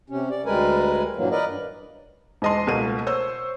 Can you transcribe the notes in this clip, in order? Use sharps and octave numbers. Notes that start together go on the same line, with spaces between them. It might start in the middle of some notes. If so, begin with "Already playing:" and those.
C3 C#4
D5
D2 G3 G#3 A#4 B4 G#5
G2 A#2 E3 F#3 A#3
A#4 B4 D5 D#5
G2
E1 G#3 D#5 A5 C6
C#2 B2 A3 A#3 A#4 D#7
C5 C#5 E6